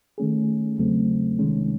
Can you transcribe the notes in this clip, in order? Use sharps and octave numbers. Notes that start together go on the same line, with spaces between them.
D#3 A3 C#4 G#4
E2 C#3 F#3 A3 C4
C2 C3 D#3 G#3 C#4